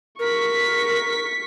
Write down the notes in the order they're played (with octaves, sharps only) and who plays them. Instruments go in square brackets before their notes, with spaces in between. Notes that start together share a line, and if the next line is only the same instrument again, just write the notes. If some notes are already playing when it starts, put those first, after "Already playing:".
[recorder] A#4 [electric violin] C#6 B6